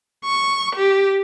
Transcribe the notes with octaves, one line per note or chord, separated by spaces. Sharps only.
C#6
G4